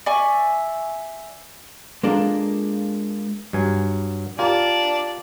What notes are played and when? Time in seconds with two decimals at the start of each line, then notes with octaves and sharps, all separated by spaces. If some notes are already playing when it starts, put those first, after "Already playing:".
0.06 D5 E5 G#5 C#6
2.03 G#3 A#3 D4 F4 A4
3.53 G2 F#3 G#5
4.39 F4 G4 A#4 D5 A5